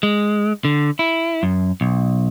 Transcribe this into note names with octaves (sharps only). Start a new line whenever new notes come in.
G#3
D3
E4
F#2
B1